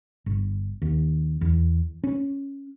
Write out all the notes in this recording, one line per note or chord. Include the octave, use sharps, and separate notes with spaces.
G1
D#2
E2
C#4